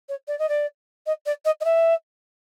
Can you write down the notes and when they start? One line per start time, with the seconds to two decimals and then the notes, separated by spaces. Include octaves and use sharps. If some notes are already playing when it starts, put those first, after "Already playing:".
0.09 C#5
0.27 D5
0.39 D#5
0.49 D5
1.06 D#5
1.26 D5
1.45 D#5
1.60 D#5
1.64 E5